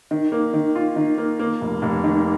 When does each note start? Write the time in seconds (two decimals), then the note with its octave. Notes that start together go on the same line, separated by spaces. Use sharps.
0.11 D#3
0.32 A#3
0.54 D#3
0.75 F4
0.96 D#3
1.18 A#3
1.39 A#3
1.61 F1
1.82 F1
2.04 D#3